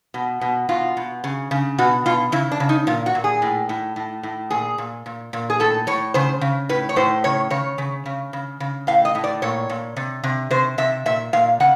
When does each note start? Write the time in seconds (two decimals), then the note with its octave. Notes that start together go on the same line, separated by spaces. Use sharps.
0.14 B2
0.41 B2
0.69 B2 F4
0.97 B2
1.24 C#3
1.51 C#3
1.78 B2 F#4
2.06 B2 F4
2.32 C#3 E4
2.52 D4
2.60 C#3
2.69 D#4
2.87 A#2 F4
3.06 F#4
3.15 A#2
3.24 G#4
3.42 A2
3.69 A2
3.96 A2
4.23 A2
4.50 A#2 G#4
4.78 A#2
5.06 A#2
5.33 A#2
5.50 G#4
5.60 A2 A4
5.87 A2 C#5
6.14 C#3 C5
6.41 C#3
6.69 A2 B4
6.89 C#5
6.96 A2 C5
7.24 C#3 C#5
7.50 C#3 C#5
7.78 C#3
8.06 C#3
8.33 C#3
8.60 C#3
8.87 A2 F5
9.05 D#5
9.15 A2
9.24 D5
9.42 A#2 C#5
9.70 A#2
9.96 C3
10.24 C3
10.51 C3 C5
10.78 C3 E5
11.06 A#2 E5
11.33 A#2 F5
11.60 C#3 F#5